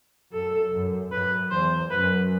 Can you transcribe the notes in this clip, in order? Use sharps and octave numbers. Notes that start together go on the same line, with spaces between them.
F#2 A4
F#2
F#2 B4
E2 C5
F#2 B4